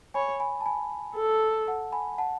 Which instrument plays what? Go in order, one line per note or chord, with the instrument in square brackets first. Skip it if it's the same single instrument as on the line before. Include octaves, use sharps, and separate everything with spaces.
[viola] C#5 [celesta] G#5 B5
[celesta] G#5 B5
A5
G#5 B5
[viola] A4
[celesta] F#5 A5
G#5 B5
F#5 A5